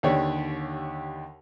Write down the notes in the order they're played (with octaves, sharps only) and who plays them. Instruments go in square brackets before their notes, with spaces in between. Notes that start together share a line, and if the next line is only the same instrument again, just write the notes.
[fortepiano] D#2 D3 G4 C#5 D5